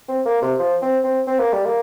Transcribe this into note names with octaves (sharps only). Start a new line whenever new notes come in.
C4
A#3
C3
F3
C4
C4
C4
A#3
G3
A#3